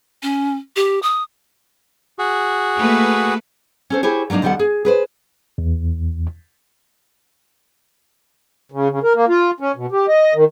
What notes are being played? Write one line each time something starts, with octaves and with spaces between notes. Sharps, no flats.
C#4
G4
D#6
F#4 G#4
A3 A#3 B4
C#4 A4 C5
E4 G4 G#4 C5 C#5
F#3 G3 A#3 D4 D#4
D#2 D#3 F3 G3 A4 F#5
G#4
G#4 B4 C5
E2
C#3
C#3
A#4
A#3
F4
C#4
B2
G4
D#5
D#3